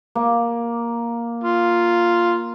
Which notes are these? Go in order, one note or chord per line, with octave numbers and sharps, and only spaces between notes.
A#3
F4